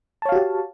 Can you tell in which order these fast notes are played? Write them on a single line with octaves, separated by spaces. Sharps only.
A5 C#5 F5 F#4 G4